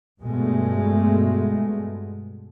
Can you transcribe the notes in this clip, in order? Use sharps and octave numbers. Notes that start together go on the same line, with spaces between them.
G2 B2 G#3 A3